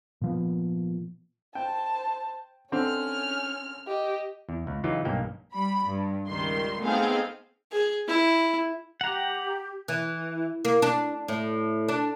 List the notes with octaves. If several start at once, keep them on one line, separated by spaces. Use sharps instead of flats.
A#2 F3 B3
C5 G5 A5
D3 C4 C#4 F6
G4 D#5
E2
C#2
C#3 E3 F#3 D#4 F4 G4
B1 G2 A#3 C#4 G5
G3 B5
G2
C#2 D#3 G3 C6
A3 B3 C4 D#4 G#4 F5
G#4
E4
G4 F#5 A#5
E3
A#3
D4
A2
D4